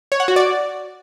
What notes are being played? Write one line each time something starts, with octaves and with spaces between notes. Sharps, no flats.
C#5
F#5
F#4
D5